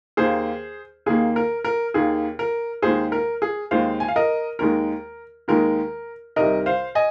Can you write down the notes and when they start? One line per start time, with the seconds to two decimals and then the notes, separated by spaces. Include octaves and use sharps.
0.17 D#2 D#3 A#3 G#4 C5
1.06 D#2 D#3 A#3 G#4
1.36 A#4
1.64 A#4
1.94 D#2 D#3 A#3 G#4
2.39 A#4
2.82 D#2 D#3 G#3 G#4 C5
3.12 A#4
3.42 G#4
3.71 D#2 D#3 G#3 C5 F5
4.00 G#5
4.08 F5
4.16 A#4 D#5
4.59 D#2 D#3 G#3 A#4
5.48 D#2 D#3 G#3 A#4
6.36 C2 C3 D#3 A#4 D#5
6.66 C5 F5
6.95 D#5 G#5